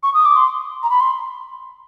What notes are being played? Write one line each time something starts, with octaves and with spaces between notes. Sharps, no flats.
C#6
D#6
D6
C6
A#5
B5
C6